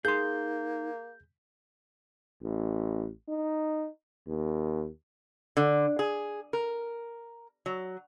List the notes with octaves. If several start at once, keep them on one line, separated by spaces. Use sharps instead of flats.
A#3 D#4 G#4 C6 G6
A1
D#4
D#2
D3
G#4
A#4
F#3